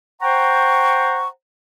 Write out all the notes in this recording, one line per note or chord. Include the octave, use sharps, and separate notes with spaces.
C5 F#5 G5 A#5 C#6